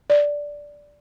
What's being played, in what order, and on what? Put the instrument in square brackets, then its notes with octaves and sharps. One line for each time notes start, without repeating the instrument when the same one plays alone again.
[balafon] D5